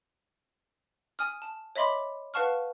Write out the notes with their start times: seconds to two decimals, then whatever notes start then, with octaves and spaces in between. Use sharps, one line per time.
1.19 G#5 D#6 F6
1.42 A5
1.76 C#5 D#5 E5 B5 C6 D6
2.34 B4 F5 F#5 A5 C#6 F6